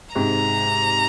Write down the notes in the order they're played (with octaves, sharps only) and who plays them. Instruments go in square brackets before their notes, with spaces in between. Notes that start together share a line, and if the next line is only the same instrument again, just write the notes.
[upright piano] G#2 C3 [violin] A#5